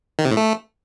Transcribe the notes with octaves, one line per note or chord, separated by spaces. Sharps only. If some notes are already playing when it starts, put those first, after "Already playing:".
D#3
C3
A2
A3